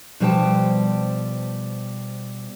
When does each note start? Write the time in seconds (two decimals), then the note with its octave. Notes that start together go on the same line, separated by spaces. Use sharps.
0.20 B2 F3 G3 C5 G5 A5